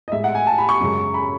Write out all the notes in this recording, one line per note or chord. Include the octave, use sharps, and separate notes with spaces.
D#5
A2 G#3 E5
F#5
G#5
A5
B5
C#6
F#2 C#3 G#3
B5